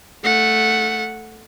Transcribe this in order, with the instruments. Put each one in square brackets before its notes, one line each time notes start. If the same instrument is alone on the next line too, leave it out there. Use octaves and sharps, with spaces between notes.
[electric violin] A3 F#5